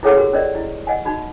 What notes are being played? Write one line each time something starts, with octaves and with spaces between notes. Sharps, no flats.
E4 G#4 A4 C#5 F#5 D#6
F#4 G4 A#4
C#4 A#4 D5 D#5
E4
D#5 F#5 G#5
D#4 F#4 B5